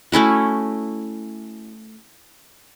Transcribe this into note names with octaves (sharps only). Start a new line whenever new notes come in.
A3 C#4 E4 F#4